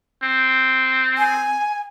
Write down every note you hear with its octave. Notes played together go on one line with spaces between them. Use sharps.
C4
G#5